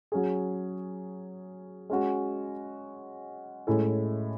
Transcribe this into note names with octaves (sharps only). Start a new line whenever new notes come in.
F#3 C#4 G#4
G#3 C#4 F#4
A2 G#3 C#4 E4 A4